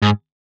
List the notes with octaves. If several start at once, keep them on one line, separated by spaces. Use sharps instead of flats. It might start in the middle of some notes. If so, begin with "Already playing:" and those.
G#2